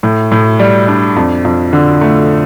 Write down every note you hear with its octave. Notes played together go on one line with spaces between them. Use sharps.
A2
A2
G3
D4
F2
F2
D3
A3